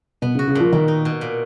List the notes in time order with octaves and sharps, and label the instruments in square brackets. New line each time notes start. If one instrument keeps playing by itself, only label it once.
[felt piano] B2 [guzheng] B3
[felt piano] C#3
[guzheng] F#4
[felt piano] C#3
[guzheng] A#2 [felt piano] F3
[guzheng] B2 [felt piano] D#3
[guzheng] D#4
B2
A#2